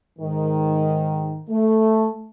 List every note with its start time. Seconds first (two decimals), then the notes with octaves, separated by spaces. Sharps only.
0.19 G#2 D#3
1.50 A3